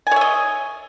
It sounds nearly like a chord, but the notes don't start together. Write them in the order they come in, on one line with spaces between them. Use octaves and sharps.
G#5 C#5 E5 D#5